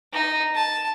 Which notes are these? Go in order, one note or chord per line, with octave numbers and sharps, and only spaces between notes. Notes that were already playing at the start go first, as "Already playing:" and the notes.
D#4
A5